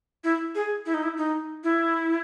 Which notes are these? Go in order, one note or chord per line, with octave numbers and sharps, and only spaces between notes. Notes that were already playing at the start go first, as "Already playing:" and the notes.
E4
G#4
E4
D#4
E4
D#4
E4